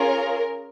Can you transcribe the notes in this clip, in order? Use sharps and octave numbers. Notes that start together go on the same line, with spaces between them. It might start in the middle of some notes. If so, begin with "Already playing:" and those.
Already playing: C#4 F4 G#4 A#4